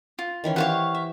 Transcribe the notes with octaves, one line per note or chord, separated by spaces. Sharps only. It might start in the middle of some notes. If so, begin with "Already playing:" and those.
F4
D#3 E3 C#4
E4 G4 C5 C#5 F5 F#5
E5